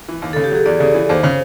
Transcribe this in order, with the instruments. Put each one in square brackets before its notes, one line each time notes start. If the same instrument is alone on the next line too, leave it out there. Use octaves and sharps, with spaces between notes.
[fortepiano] E3
D#2
[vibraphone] A4
[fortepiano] C#3
[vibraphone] G4
[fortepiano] F#3 [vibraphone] G#4
[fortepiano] E2 [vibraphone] D5
[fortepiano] C#3
E3
[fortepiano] D#2 [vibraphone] C5
[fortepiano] C#3